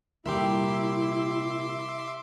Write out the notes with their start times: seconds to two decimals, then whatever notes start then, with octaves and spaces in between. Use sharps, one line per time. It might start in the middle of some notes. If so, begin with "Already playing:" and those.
0.26 C2 A#2 E4 G4 A#4 E5 C6 D6